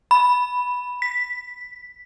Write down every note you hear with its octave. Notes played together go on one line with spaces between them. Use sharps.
B5
B6